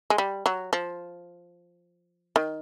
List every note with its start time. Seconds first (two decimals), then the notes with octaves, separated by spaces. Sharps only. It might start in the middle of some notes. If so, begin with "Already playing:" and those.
0.10 G#3
0.18 G3
0.46 F#3
0.73 F3
2.36 D#3